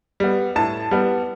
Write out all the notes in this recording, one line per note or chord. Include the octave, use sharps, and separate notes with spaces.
G3 B3
A2 A5
G3 B3